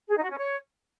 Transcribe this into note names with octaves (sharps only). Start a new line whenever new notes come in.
G#4
D#4
F#4
C#4
C#5